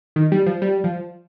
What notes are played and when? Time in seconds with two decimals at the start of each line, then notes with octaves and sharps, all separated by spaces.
0.16 D#3
0.32 G3
0.46 F3
0.62 G3
0.84 F3